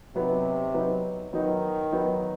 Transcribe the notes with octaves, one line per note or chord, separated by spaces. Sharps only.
C3 F#3 B3 D#4
F#3 B3 D#4
D#3 F#3 B3 D#4
F#3 B3 D#4